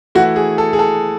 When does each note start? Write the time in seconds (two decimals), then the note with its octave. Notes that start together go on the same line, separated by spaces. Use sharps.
0.15 E3 A3 E4 F#4
0.36 G#4
0.58 A4
0.73 G#4
0.79 A4